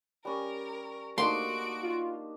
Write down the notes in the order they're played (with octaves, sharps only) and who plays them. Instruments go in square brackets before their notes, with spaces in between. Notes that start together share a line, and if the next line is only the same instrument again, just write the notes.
[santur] G3 C#4 [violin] A#4
[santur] A#3 D4 D#4 [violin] F#4 D7 [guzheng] C6
[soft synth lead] F4